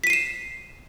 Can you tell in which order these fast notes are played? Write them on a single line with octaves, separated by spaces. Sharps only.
B6 D#7 C7 E7